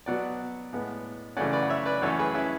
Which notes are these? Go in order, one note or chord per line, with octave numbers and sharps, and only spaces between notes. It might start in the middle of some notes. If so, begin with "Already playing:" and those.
B2 F#3 B3 D5 F#5
A2 G#3 B3
F#2 C#3 E3 A3 C#4 D5 F#5
B4 D5
F#5
C#5 E5
B4 D5
F#2 E3 A3 C#4 A4 C#5
G#4 B4
C#4 E4